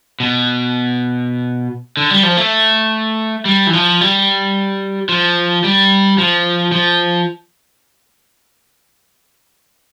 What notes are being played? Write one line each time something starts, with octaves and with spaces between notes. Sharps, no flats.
B2
D3
G3
F3
A3
G3
E3
F3
G3
F3
G3
F3
F3